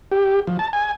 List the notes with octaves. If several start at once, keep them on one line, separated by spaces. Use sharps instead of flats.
G4
F3
A5
G#5